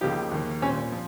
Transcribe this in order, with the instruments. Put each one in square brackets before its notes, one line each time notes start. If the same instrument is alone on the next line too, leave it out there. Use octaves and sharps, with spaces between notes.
[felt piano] C#2 C#3 F3 A#3 D#4 [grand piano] G4
[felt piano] D#2 D#3 A#3
[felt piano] A#2 G3 C4 [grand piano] C#4
[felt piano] F3